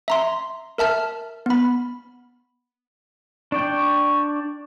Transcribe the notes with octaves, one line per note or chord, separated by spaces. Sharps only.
E5 A#5 C6
A#4 E5 A5 F6
B3 B5
D4 D5 G5 C#6